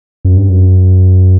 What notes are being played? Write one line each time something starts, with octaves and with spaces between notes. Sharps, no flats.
F#2
G2
F#2